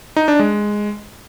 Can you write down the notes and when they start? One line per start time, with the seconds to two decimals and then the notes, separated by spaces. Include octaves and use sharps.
0.16 D#4
0.28 D4
0.39 G#3